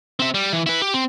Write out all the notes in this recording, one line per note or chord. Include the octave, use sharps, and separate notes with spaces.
C4 E5
G3
E3
E4 B4
G4
C4